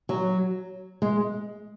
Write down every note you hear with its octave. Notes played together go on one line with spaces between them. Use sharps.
F#3
G#3